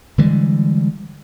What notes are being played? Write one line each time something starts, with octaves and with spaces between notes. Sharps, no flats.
D3 E3 G3 G#3